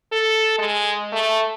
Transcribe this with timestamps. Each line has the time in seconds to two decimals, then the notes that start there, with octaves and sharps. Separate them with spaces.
0.12 A4
0.59 G#3
1.12 A3